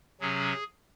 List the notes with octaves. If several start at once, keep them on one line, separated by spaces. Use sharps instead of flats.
C3 F#3 C#4 G#4